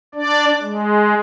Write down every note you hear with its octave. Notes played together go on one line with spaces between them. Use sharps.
D4 D5
G#3